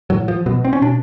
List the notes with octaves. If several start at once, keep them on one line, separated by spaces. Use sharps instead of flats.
A2 F#3
F3
B2 F#3
C4
C#4
B2 D4